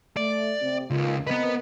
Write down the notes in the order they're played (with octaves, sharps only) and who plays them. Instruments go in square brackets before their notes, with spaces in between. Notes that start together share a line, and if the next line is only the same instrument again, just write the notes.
[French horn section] A3 [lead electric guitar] D5
[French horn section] C3
[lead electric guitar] C#2 [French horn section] A#3 D#4 F4
[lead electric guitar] B3 B4 [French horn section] C4 A#4 D#5